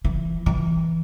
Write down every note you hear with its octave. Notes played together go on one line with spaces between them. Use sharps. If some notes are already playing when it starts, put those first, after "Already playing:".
E3
E3